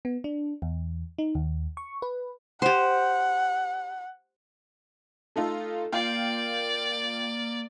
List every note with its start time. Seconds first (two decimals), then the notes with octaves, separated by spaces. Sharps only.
0.05 B3
0.24 D4
0.62 E2
1.18 D#4
1.35 D#2
1.77 C#6
2.02 B4
2.62 G4 C5 F#5
5.36 A3 D#4 F4 A4
5.93 A#3 F4 D5 F5 G5